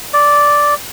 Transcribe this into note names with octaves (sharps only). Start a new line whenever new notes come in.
D5